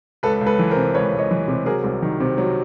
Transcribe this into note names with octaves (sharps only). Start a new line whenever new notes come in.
C#2 A4 B4
C#2
A4 B4
E3
A#4 C5
C3
C#2 B4 C#5
C#2
C#5 D#5
E3
C3
F#3 G#4 A#4
C2
D#3
C3
F#3